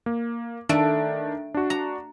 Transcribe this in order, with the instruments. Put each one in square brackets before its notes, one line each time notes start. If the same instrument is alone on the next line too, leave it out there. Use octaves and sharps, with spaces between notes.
[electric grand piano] A#3
[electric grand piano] D#3 D4 D7 [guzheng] A3
[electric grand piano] D4 F#4
[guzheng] A#5